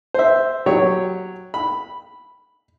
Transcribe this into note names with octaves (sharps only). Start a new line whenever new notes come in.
C5 E5
F#3 G4 C#5
B5